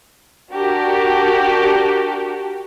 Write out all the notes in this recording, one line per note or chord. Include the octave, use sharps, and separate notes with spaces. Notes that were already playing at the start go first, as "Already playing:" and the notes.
D4 F#4 G4 A#4